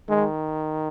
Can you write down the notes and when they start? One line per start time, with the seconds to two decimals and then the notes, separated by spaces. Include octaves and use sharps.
0.09 D#3 G#3